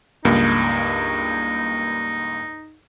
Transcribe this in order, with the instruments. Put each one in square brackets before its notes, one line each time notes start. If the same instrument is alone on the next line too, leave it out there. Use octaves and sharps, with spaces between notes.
[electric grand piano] C#2 G2 A#3 [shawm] D#4